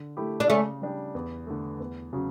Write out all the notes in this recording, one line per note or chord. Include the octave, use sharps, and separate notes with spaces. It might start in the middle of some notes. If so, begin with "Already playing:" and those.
Already playing: D3
A3 E4 G4
D4
C#3 A3 C#4
G3 D4 G4
E2
D3 A3
E2
C#3 F#3 C#4